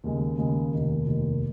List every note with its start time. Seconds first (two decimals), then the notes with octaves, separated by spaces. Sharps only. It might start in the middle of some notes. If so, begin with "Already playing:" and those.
0.04 D#2 C#3 G#3
0.38 D#2 C#3 G#3
0.72 F1 D#2 D#3
1.07 F1 D#2 D#3